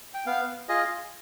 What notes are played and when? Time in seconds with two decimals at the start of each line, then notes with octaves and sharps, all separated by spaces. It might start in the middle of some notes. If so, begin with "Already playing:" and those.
0.14 G5
0.26 B3 F5
0.69 F4 G#4 D#5